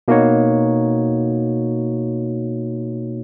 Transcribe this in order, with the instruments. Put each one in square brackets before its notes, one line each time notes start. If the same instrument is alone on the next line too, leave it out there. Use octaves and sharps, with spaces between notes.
[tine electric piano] B2 A#3 D#4 F#4 C#5